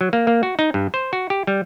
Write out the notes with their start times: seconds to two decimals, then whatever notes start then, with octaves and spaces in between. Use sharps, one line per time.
0.01 F#3
0.13 A#3
0.27 A#3
0.43 F#4
0.59 D#4
0.74 G2
0.94 C5
1.13 F#4
1.30 G4
1.47 G3